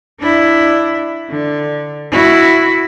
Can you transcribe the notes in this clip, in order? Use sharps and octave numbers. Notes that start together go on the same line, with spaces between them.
D4 E4
D3
E4 F#4